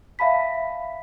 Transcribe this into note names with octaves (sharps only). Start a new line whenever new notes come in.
E5 F5 A5 B5 B6